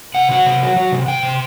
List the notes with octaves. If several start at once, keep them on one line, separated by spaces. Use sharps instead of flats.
C3 F#5
F#3 F#5
C3
F#3
F#3
C3
C3 G5
C3